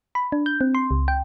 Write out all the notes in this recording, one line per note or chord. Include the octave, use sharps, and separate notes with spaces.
B5
D4
G6
C4
C6
C#2
G5